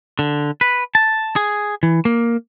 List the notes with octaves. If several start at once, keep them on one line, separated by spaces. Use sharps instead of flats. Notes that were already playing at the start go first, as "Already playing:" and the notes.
D3
B4
A5
G#4
E3
A#3